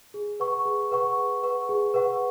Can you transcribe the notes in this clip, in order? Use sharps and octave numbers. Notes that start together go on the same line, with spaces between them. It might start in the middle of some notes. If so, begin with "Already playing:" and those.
G#4
B4 F#5 C#6
G#4
B4 F#5 C#6
G#4
B4 F#5 C#6
G#4
B4 F#5 C#6